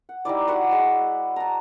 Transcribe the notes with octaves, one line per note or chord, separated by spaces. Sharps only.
F#5
G3 D#4 E4 D5
F#4 B4 E5 F#5
G#3 E6
A5 A#5